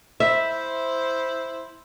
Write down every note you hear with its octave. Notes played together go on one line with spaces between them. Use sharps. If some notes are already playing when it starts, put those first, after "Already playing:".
E4 C5 E5